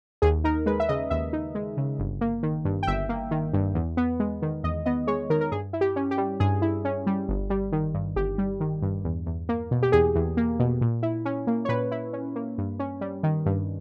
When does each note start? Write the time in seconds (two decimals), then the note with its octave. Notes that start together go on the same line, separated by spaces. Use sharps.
0.22 D#2 G#4
0.44 D#4 A#4
0.66 G#3 B4
0.80 E5
0.89 C#3 D#5
1.10 D#2 E5
1.33 D#4
1.55 G#3
1.77 C#3
1.99 G1
2.21 A#3
2.43 D#3
2.65 G2
2.83 G5
2.87 G1 E5
3.09 A#3
3.31 D#3
3.53 G2
3.75 E2
3.97 B3
4.20 G#3
4.42 D#3
4.64 E2 D#5
4.86 B3 D#5
5.07 G#3 C#5
5.30 D#3 A#4
5.41 A#4
5.52 G2 G#4
5.73 E4
5.81 G4
5.96 C#4
6.11 G4
6.18 G3
6.40 G2 G#4
6.62 E4
6.85 C#4
7.07 G3
7.29 G1
7.50 G3
7.72 D#3
7.94 G2
8.16 G1 G4
8.38 G3
8.60 D#3
8.82 G2
9.05 E2
9.26 E2
9.49 A#3
9.71 B2
9.83 G4
9.92 E2 G#4
10.15 E2
10.37 A#3
10.59 B2
10.81 A#2
11.03 E4
11.25 C#4
11.47 A#3
11.65 C#5
11.69 A#2 B4
11.91 E4
12.13 C#4
12.35 A#3
12.58 G2
12.79 C#4
13.01 G3
13.23 D#3
13.46 G2